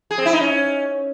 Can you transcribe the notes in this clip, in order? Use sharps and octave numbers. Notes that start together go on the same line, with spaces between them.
G#4
C4
E4
D#4
C#4